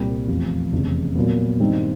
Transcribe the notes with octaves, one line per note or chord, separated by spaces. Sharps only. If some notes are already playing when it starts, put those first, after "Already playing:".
Already playing: C2 A#2 G3 C4
F1 E2 C3 F3
F1 E2 C#3
A#2 F#3 B3
G2 D#3 G3 C4 D#4